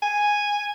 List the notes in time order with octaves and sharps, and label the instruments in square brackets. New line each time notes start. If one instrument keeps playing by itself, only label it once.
[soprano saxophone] G#5